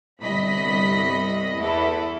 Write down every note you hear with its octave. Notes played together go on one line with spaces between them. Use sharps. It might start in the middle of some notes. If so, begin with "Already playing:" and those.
G1 C2 D#5 B5 B6
E2 E4 A4